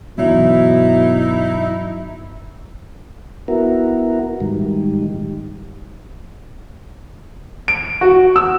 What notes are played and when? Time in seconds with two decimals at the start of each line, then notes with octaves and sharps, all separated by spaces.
0.18 G2 B2 E3 F#3 D#4 E4
3.48 B3 E4 F#4 A#4
4.40 G#2 D#3 G3
7.68 D7
8.01 F#4
8.36 E6